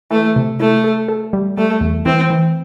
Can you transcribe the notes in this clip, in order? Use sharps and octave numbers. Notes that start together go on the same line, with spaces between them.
E3 A3
C3
A3 E4
A4
A4
G3
G3 A3
E2
E3 C4
E3